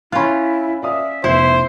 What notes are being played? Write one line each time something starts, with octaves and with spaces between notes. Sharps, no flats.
C#4 E4 F4 B5 F#6
D5 E5 F5 D#6
F1 B2 E4 C5